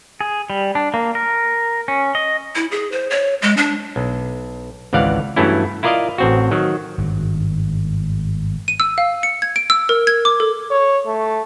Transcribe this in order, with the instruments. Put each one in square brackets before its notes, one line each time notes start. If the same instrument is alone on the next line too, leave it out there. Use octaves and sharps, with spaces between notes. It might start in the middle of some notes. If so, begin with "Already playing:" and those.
[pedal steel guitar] G#4
G3
D4
A#3
A#4
C#4
D#5
[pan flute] E4
G#4
C5
C#5
G#3
D4
[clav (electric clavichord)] B1
G#1 C#2 E3 D5 F5 F#5
G2 E3 F#3 A3 C#4 E4
E4 F4 A#4 D5 D#5 F5
A1 C4 F#4
D#3 F#3
[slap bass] G#1 G2
[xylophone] D#7
E6
F5
C#7
G#6
D7
E6
A#4
G#6
D6
A4
[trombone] C#5
A3